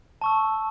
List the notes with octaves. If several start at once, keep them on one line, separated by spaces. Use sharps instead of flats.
A5 C#6 E6